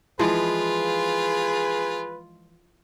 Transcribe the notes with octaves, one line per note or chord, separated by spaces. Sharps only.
E3 F3 G#3 F4 G#4 B4